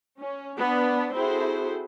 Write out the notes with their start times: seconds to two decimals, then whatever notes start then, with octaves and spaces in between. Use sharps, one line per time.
0.18 C#4
0.58 B3 D4
1.15 C4 E4 F#4 G#4 A4 C5